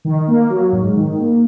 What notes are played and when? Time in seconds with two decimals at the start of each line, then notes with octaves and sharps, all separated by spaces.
0.05 D#3
0.28 A#3
0.50 F#3
0.72 G#2
0.96 D#3
1.18 A#3